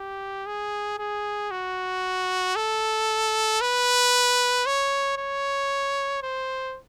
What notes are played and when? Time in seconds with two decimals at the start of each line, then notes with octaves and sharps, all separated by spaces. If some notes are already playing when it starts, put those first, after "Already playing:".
Already playing: G4
0.46 G#4
0.99 G#4
1.51 F#4
2.56 A4
3.61 B4
4.66 C#5
5.18 C#5
6.23 C5